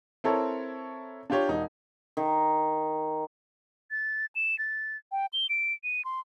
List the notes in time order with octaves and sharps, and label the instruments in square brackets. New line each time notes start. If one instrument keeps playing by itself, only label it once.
[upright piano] C4 E4 A4 A#4 C#5
D4 F4 G4 C#5
E1 D#4
[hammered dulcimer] D#3
[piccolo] A6
E7
A6
G5
G7
D7
D#7
C6